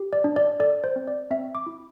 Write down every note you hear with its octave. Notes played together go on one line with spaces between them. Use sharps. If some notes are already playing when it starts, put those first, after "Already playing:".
Already playing: G4
D5
D4
D5
A4 D5
C5
C4
D5
C4 E5
D6
E4